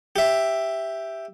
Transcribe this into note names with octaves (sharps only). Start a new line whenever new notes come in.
G4 E5